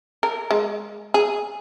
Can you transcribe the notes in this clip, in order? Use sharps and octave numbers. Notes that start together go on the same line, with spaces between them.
A#4
G#3
G#4